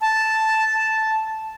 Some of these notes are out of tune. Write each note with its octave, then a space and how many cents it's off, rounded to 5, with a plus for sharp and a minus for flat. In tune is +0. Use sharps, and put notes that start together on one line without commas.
A5 +0